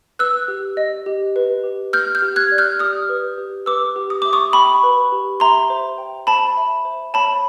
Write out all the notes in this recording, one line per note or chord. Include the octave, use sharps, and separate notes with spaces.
B4 E6 F#6
G4
D#5
G4
B4
G4
B4 F6 G6
F6 G6
G4
F#6 G#6
D5
F6 G6
G4 D#6 F6
B4
G4
B4 D6 E6
G4
D#6
E5 D6
C#6 D#6
G5 B5 C#6
B4
G4
E5 A#5 C6
C5
G5
C5 A5 B5
E5
C5
C#5 A5 B5